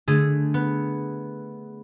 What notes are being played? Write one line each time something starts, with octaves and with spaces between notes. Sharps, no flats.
D3 A3 G#4
B3